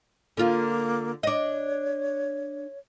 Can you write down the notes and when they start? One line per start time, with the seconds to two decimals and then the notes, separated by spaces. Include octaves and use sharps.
0.37 D3 A#3 F4
1.23 D4 C#5 D#5